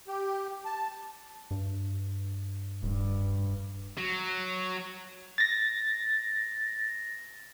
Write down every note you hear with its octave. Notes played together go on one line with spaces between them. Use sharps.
G4
A5
G2
D#1 G2
F#3
A6 A#6